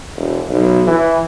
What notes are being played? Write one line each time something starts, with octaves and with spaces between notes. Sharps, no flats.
E1
B1
E3